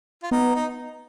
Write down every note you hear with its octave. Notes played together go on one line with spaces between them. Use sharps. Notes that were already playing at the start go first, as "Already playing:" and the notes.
F4
B3 D#4
D#4